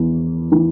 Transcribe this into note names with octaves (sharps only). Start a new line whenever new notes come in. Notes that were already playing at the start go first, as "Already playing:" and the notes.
Already playing: E2 E3
E3